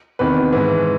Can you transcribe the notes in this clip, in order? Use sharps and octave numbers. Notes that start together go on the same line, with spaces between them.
E2 C3 D#3 B4
G#2 E3